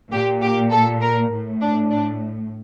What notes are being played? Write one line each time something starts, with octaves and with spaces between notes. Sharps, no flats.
A#2 G4
G4
A4
A#4
A2
D4
D4